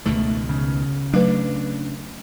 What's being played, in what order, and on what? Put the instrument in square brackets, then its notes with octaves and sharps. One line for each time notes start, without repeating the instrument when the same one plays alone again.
[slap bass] C#2 B2 D#3 [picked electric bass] A3
[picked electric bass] C#3
[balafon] F#3 A3 B4 [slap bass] D4